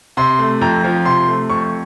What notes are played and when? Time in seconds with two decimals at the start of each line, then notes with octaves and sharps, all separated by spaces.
0.17 C3 C6
0.39 A3
0.61 F2 A#5
0.84 F3
1.05 C3 C6
1.28 A3
1.50 F2 C#6